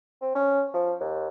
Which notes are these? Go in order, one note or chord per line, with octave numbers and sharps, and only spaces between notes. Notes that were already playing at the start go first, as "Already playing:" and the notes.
C4
C#4
F3
D#2